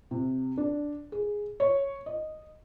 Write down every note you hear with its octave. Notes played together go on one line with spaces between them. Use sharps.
C3
D4
G#4
C#5
D#5